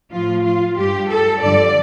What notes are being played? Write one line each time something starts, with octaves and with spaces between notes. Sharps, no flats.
A2 F3 F4
F4
G2 G3 G4
A4
G2 D3 F3 D5